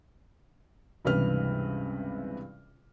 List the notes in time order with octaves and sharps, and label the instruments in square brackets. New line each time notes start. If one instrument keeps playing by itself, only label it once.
[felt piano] C#2 G2 C3 E3 B4 F6